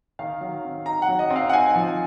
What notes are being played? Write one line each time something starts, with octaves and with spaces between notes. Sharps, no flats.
D#3 F5
F#3
C4
D#4 A#5
F#5
F#3
D#5
C4
F5
F#5
D#4 G#5
F3